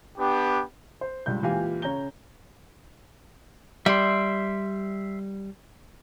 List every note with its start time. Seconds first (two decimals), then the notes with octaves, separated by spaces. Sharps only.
0.18 B3 D4 G4
1.01 C5
1.26 C#2 G2 G6
1.42 C#2 A#2 E3 G4 F5 G#5
1.82 C#3 C#5 A#5 G6 G7
3.86 G3 E5 C6